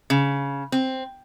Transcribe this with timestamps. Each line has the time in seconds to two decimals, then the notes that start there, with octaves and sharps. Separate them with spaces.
0.10 C#3
0.72 C4